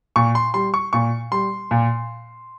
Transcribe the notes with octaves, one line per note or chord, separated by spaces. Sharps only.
A#2 C#6
C6
G3 C6
C#6
A#2 C#6
G3 C6
A#2